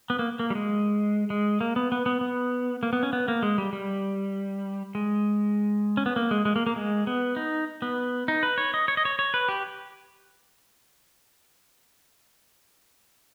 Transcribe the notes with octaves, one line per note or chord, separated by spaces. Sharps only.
B3
A#3
A#3
G3
G#3
G#3
A#3
B3
B3
B3
B3
A#3
B3
C#4
B3
A#3
G#3
G3
G3
G#3
C#4
B3
A#3
G#3
G#3
A#3
A#3
G#3
B3
D#4
B3
D#4
B4
C#5
D#5
C#5
D#5
C#5
C#5
B4
G4